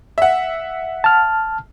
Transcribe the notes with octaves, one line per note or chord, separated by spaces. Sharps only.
E5 F#5
A5 F6